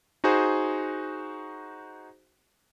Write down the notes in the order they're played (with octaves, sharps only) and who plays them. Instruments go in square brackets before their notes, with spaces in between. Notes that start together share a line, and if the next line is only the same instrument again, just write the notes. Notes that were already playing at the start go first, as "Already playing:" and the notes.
[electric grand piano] D#4 F#4 G#4 C5